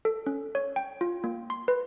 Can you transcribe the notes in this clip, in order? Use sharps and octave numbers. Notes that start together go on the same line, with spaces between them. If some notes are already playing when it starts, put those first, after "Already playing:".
A4
C#4
C#5
G5
F4
A#3
C6
B4